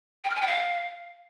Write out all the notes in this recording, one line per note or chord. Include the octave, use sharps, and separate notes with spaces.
G5
F6
G#5
G5
F5